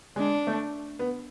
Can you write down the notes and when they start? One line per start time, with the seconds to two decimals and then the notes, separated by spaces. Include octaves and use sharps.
0.16 G#3 D4
0.47 A3
0.99 B3